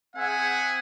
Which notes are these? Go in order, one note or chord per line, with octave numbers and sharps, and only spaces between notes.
C4 G#4 E5 F#5 G#5